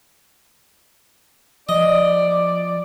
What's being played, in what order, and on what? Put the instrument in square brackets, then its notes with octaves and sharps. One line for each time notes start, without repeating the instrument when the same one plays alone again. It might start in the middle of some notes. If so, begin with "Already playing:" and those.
[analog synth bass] F3 [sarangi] D5 [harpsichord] D#5